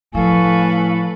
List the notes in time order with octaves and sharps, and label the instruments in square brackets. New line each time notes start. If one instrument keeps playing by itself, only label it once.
[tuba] A2 [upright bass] F3 [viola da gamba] A4 B4 [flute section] F5 G#5 C#6